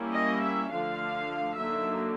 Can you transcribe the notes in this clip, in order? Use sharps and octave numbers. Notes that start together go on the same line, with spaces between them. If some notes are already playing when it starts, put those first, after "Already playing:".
Already playing: G3 A#3 C#4 E4
D#5
E5
D3 F3 A3 D4 F5
D3 F#3 A#3 D#4 E5